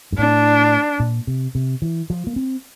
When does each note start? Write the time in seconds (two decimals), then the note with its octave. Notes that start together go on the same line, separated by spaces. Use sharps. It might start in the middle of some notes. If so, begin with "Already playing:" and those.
0.12 G2
0.18 A2 D4
1.00 A#2
1.27 C3
1.55 C3
1.82 E3
2.10 F3
2.27 A#3
2.36 C4